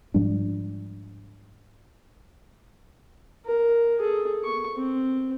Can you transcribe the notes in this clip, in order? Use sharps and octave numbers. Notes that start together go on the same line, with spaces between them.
G#2 F3 G3 D4
A#4
G#4 A4
C#6
C4